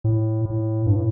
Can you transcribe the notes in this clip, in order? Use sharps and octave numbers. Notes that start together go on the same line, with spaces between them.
A2
A2
G2
A2